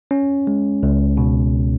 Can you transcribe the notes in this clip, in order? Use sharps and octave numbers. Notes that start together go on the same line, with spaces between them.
C#4
G#3
C#2
B2